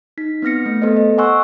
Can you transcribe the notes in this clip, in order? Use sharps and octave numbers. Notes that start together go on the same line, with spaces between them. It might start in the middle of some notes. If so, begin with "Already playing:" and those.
D#4 B6
B3 C4 F6 A#6 C#7
A3
B3 A4 C5 D#5
D#5
F#5 G#5 C6 C#6 E6 F#6